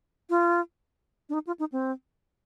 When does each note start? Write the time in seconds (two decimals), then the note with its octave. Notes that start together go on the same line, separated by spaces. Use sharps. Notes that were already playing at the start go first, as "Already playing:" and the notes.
0.30 F4
1.29 D4
1.34 D#4
1.47 F4
1.59 D#4
1.72 C4